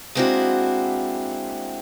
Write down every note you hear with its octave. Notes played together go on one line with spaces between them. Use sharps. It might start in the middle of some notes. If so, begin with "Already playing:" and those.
G#3 A#3 C4 D4 E4 F#4